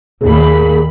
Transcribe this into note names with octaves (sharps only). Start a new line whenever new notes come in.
D#2 A#2 G#4 B5